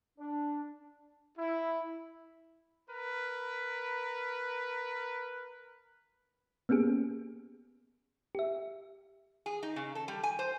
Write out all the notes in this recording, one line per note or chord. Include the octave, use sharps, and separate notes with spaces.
D4
E4
A#4 B4
A#3 B3 C#4 G4 G#4
G4 E5
G#4
D#4
C#3
A4
G3
G#5
C5